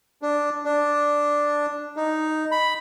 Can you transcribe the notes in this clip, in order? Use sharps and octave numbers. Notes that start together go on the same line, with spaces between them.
D4
D4
D#4
B5